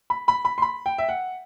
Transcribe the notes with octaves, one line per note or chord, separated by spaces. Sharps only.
B5
B5
B5
C6
B5
G5
E5
F#5